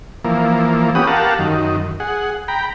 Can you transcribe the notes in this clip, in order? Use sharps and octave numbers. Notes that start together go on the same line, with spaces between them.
E3 F3 A#3
B3 C#4 G4 F#5 D#6
G4 A#4 F5 F#5 A5
F#2 D#3
G#4 F#5
G5 A#5 B5